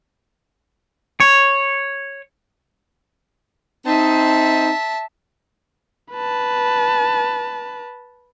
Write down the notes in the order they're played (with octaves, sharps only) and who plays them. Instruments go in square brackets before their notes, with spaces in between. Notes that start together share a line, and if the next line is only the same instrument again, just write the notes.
[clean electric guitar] C#5
[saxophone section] C4 D#4 [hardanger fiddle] E5 A5
[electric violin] B4 A5